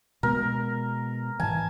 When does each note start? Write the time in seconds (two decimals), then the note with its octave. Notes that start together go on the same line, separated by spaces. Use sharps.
0.23 B2 G#3 B3 A#4
1.40 G#2 E3 G#5 A5